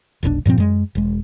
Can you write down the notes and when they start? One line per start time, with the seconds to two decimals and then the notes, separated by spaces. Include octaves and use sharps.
0.23 F1 B1 A#2 D4
0.45 G2 A#2 F3 C4
0.58 F#2 G#3
0.95 E1 G#3